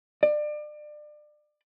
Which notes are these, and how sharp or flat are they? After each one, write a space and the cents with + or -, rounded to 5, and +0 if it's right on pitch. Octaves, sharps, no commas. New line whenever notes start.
D5 +30